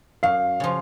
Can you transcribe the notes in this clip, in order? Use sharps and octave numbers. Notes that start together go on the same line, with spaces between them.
F#2 F5
C#3 F3